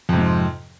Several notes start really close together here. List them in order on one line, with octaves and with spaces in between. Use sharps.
F2 C3 G#2